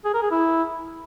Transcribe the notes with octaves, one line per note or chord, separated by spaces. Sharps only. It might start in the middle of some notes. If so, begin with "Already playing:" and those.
G#4
A#4
G#4
E4